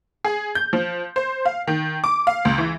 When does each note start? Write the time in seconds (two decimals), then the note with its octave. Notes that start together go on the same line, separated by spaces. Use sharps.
0.24 G#4
0.55 G6
0.73 F3
1.16 C5
1.45 F5
1.67 D#3
2.04 D6
2.27 F5
2.45 C#2
2.58 E3